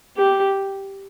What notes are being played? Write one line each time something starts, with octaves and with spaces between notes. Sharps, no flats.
G4